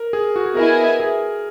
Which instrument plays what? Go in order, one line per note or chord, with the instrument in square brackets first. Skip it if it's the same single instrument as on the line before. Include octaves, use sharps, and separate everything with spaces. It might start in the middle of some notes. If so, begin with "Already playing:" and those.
Already playing: [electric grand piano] A#4
G#4
F#4
G#4
[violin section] B3 E4 G#4 D#5 G#5 [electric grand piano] A#4
[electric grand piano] G#4